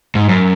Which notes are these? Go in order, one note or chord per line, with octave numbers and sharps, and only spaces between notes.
G#2
F#2